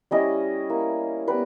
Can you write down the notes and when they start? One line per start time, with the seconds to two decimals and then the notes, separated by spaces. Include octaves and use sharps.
0.11 G3 C#4 E4 D#5
0.70 A#3 E4
1.27 G3 B3 B4